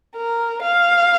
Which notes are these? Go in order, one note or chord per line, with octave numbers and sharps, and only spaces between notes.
A#4
F5